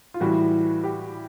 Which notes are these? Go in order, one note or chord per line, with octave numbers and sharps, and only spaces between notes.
F4
A2 E3 G3 F#4
G4